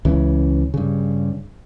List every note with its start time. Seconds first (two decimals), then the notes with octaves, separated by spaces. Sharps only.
0.05 C#2 C#3 E3
0.74 G2 C#3